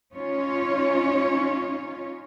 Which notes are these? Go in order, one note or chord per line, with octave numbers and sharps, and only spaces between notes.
C#4 D#4 F4 C#5